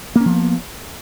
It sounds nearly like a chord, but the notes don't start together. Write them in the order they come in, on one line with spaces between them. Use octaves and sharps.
A#3 C#4 F3 B3